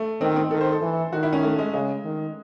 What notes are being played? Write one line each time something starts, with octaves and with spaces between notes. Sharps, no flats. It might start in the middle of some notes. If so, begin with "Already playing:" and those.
Already playing: A3
D#3 C4
C4
D#3 A4
C5
A4
E3
D#3 F#4
E4
C#4
A3
G#3
C#3 G#3
D#3